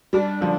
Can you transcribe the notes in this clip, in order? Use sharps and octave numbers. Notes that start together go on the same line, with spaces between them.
G3 D4
D3 F3